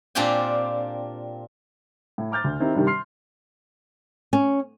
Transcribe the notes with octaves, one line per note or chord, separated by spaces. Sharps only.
A#2 C4 D4 F4 G4 G#5
A2
A#5 D6 F6 G6 A6
D2
D#3 C4 D#4 E4 G4
G2 C3 D#3 G3
C6 F6 C7
C#4